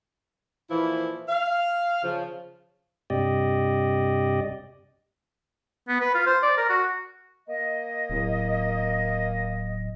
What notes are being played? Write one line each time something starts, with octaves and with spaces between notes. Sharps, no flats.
A#2 E3 F3 E4
F5
C#3 F3
G2 C3 G4 D5 D#5
B3
B4
F4
C5
D5
A#4
F#4
A#3 D#5
D1